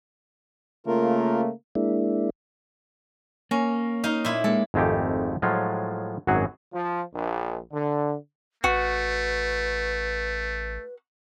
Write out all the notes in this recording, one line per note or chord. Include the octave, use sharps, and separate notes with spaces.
C#3 A3 A#3 F4 A#4
G#3 A#3 D4 E4
A#3 C#4
D#4 F5
A#2 E4
G#3 A#3 A4
G#1 F2 G#3 A3 G4
A2 F3 F#3 G#3 F4
G#1 F#2 F#3 F#4 G#4
F3
A#1
D3
A1 A3 F#4 B4